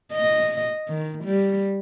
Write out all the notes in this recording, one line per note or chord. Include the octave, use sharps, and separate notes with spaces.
D#5
D#3
G3